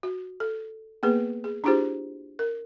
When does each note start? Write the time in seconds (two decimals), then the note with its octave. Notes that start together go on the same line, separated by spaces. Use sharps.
0.03 F#4
0.40 A4
1.03 A#3 B3 G#4 B4
1.44 G#4
1.64 D4 E4 F4 G4 G#4 C5
2.39 A#4